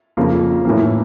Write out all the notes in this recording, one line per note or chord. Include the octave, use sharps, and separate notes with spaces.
F2 C#3 F3 A#3
A2 E3 A#3